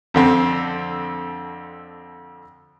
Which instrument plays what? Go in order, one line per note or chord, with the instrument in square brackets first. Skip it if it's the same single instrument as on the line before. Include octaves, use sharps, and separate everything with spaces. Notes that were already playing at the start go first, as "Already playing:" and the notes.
[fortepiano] F2 D3 C4